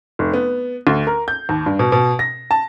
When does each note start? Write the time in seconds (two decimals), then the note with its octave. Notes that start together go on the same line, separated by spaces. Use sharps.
0.19 F1
0.34 B3
0.87 D2
1.07 A#4
1.28 G6
1.49 D#2
1.66 G2
1.79 B2
1.92 B2
2.19 A#6
2.51 A5